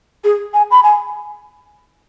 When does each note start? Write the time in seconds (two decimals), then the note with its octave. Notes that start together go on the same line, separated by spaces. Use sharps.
0.24 G#4
0.54 G#5
0.71 B5
0.83 G#5